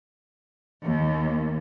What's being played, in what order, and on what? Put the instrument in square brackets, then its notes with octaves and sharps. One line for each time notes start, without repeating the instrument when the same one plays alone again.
[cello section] D#2